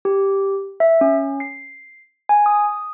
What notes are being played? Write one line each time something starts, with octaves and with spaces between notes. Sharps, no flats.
G4
E5
C#4
C7
G#5
D#6